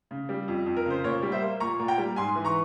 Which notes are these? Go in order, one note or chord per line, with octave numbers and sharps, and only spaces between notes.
C#3
G3
F2
F2
A#4
C#3 C5
A#2 A#4 C#5
G3
C5 E5
A#3
A#2 A#5 C#6
A#2
G5 A#5
G3
G#2 G#5 C6
E3
A#5 C#6